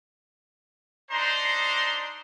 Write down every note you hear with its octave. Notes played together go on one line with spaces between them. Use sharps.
D4 D#4 C5 A#5 C6